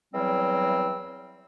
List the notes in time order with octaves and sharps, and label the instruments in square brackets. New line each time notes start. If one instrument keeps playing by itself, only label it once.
[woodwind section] E2 E3 F#3 G3 C4